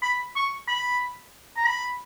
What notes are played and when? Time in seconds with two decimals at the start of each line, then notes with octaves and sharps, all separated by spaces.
0.03 B5
0.36 C#6
0.68 B5
1.57 A#5
1.67 B5